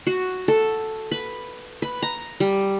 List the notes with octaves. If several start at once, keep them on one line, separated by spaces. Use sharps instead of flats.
F#4
A4
B4
B4
A#5
G3